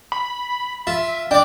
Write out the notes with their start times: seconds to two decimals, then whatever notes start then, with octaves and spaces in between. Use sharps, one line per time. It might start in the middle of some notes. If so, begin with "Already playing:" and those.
0.12 B5
0.87 F4 E5
1.31 D4 D5 G5